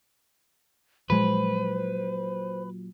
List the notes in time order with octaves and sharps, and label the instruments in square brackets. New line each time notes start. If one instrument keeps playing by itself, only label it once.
[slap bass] A#2 F#3 [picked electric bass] F3 G#3 [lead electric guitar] B4 [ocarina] C5